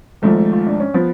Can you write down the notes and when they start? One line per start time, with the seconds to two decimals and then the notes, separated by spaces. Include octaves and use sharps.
0.22 G#1 G#2 F3 A3
0.53 F4
0.67 D4
0.80 C#4
0.94 F3 B3